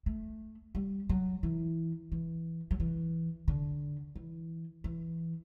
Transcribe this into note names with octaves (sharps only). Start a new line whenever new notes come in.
A3
G3
F#3
E3
E3
F#3
E3
D3
E3
E3